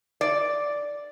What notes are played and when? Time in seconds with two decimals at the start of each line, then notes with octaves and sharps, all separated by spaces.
0.21 D5